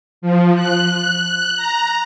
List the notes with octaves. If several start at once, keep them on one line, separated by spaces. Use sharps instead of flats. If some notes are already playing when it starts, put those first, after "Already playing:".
F3
F#6
F#6
F#6
A#5